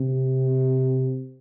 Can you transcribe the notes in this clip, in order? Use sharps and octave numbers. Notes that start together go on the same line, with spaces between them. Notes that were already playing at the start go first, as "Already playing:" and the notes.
Already playing: C3